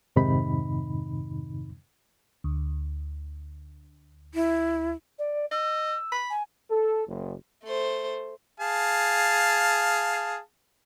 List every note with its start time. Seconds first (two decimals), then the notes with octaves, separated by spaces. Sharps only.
0.16 F2 G#2 C3 D#3 D#4 B5
2.44 D2
4.34 E4
5.19 D5
5.51 D#5 E6
6.12 B5
6.30 G#5
6.69 A4
7.07 F#1
7.64 A3 C5
8.60 G#4 F5 A5